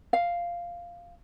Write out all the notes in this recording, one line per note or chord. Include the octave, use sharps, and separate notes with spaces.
F5